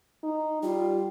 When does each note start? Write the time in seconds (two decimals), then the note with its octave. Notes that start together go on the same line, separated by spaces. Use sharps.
0.23 D#4
0.63 G3 F4